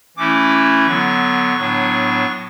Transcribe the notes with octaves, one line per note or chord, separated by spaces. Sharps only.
E3 A3 C#4 E4 D6
D3 F#3 B3 C#6
A2 F#3 B3 D4